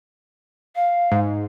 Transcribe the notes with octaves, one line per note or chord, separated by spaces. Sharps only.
F5
G#2